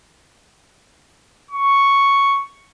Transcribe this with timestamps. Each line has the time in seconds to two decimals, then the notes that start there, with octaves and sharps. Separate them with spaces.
1.51 C#6